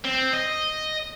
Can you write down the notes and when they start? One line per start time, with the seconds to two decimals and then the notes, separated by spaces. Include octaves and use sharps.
0.04 C4
0.34 D#5